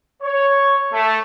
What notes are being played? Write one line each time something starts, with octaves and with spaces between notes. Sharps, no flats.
C#5
A3